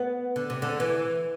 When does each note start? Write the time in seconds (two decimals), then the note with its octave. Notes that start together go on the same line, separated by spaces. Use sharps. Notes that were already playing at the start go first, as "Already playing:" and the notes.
Already playing: B3
0.36 D3
0.50 C3
0.62 D3
0.80 E3